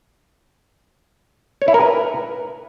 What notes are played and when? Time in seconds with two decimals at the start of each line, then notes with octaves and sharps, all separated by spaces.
1.62 C#5
1.68 E4
1.74 A#4
1.81 B4